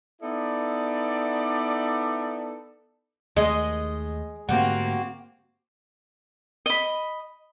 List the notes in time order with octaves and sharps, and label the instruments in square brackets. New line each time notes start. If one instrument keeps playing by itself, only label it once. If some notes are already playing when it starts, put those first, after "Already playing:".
[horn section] B3 D#4 E4 A4 D5
[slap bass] D#2 A3 [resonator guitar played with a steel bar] G#3 [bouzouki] D#5
[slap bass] G#2 D3 A3 [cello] A#3 C4 [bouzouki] F#4 G4
[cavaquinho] D#5 B5